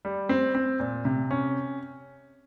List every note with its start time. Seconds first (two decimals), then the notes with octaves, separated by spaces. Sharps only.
0.05 G3
0.29 C4
0.55 C4
0.80 A#2
1.05 C3
1.31 C#4